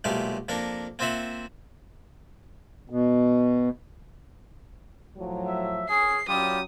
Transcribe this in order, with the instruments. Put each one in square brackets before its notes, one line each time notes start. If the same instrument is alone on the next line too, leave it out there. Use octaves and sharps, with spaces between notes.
[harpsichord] B1 A#2 G#3 A3 G4 F5
F2 A#3 D4 A#4
A#3 C4 F4 C5 E5 F#5
[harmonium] B2
[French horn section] A2 F3 F#3
[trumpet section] E5
[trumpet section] C#4 G#4 [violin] C7
[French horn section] F#3 C#4 [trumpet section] G3 F4 G4 [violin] D#6